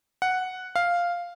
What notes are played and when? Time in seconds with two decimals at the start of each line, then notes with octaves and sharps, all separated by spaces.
0.22 F#5
0.76 F5